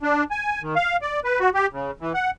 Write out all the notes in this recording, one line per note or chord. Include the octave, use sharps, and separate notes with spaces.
D4
G#5
D#3
F5
D5
B4
F#4
G4
C#3
E3
F#5